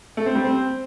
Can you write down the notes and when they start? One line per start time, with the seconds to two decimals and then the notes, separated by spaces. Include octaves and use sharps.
0.17 A3
0.26 C4
0.35 G3
0.44 C4